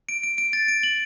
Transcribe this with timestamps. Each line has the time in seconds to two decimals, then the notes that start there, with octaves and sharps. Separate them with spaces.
0.09 D7
0.23 D7
0.38 D7
0.53 A6
0.68 D7
0.83 F#7